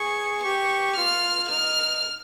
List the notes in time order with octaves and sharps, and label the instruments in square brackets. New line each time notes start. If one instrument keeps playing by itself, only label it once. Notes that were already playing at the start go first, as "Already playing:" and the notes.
Already playing: [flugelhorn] G#4 [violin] C#6
[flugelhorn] G4 [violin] C#6
[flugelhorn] F4 [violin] F6
[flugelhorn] D#4 [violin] F6